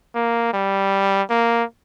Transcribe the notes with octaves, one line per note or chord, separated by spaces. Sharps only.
A#3
G3
A#3